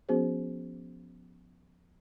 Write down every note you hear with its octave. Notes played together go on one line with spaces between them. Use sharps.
F3 B3 C#4 F#4 G#4 C5